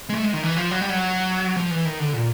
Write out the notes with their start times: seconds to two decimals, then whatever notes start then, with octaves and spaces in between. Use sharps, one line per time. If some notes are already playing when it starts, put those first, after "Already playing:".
0.09 G#3
0.14 A3
0.24 G#3
0.33 D#3
0.43 E3
0.57 F3
0.71 F#3
0.81 G3
0.90 F#3
1.56 F3
1.71 E3
1.85 D#3
1.99 D3
2.13 A#2